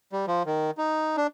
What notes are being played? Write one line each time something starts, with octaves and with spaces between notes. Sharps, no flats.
G3
F3
D#3
D#4
D4